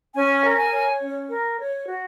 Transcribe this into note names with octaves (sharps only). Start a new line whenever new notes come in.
C#4 G#5
A#4
G#5
C#5
C#4
A#4
C#5
F#4